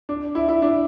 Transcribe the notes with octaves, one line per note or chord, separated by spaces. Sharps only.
D4
E4
E4
D4